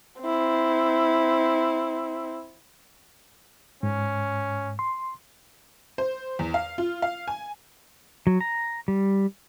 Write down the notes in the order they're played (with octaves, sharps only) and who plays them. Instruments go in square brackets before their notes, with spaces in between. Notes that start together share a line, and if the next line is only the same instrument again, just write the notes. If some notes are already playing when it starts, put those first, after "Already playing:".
[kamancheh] C4 E4
[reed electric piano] G#2 [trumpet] C#4
[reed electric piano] C6
[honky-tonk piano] C5
E2
F5
F4
F5
G#5
[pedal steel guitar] F#3
A#5
G3